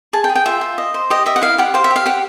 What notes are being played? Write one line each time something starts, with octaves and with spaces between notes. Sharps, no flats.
G#4 A5
G5
G#4
G5
F4 E5
F4
D#5
C5
G4 D#5
D#5 E5
F#5
E4 F5
G4 F#5
C5 F5
E5
G4
F5
G4 F#5